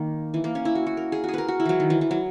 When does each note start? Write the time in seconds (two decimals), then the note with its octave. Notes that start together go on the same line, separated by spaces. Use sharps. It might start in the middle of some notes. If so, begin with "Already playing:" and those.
Already playing: D#3 A#3
0.34 E3
0.44 A#3
0.55 C#4
0.65 E4
0.75 F#4
0.87 F#4
0.97 A#4
1.12 G#4
1.24 F#4 G#4
1.34 A#4 B4
1.48 F#4
1.60 E4
1.65 E3 F#3
1.80 D#3
1.90 E3
2.01 E3
2.11 F#3